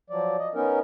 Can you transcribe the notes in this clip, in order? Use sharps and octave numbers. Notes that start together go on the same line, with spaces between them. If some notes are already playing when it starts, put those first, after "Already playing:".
F3 F#3 D5
D#5
B3 C#4 D#4 A#4